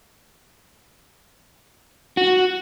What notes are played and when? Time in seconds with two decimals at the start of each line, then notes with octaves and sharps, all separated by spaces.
2.17 F#4